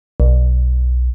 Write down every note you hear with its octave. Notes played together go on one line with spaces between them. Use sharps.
B1